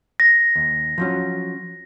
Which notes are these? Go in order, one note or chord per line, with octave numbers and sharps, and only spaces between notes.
A#6
D#2
F3 F#3 C#4